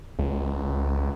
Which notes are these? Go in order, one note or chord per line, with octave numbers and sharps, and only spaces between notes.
C#2